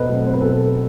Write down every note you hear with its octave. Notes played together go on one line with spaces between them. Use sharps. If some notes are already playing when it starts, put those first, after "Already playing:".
Already playing: B2 A4 B4 C5 D#5
F#3 A3 C4
C5
B4
B2 A4